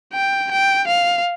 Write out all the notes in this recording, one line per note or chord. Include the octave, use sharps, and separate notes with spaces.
G5
G5
F5